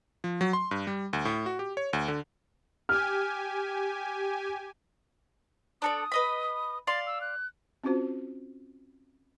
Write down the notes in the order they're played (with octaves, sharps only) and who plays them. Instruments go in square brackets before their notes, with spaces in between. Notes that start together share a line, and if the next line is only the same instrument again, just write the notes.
[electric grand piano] F3
F#3
C6
G2
G3
D2
A2
F#4
G4
C#5
D2
D3
[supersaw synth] G4 G#5 [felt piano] F6
[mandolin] D4 A4 D5 [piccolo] D#6
[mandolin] B4 D#5 B5
[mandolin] D5 F5 C6 [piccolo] A6
[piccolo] E6
F#6
[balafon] C4 C#4 F4 F#4 C5